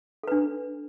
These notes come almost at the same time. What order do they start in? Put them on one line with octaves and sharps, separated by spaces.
A4 B4 D4